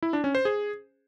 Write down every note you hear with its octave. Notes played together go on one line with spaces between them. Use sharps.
E4
D4
C#4
C5
G#4